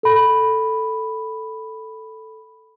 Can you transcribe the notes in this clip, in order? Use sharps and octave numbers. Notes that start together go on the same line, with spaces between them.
A4 B5